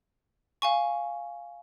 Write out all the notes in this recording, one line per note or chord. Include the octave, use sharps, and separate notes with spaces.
F5 G#5 C#6